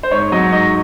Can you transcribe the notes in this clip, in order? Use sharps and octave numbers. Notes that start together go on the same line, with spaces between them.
C5
G#2 C#5
F#3 D#5
G#2 D#5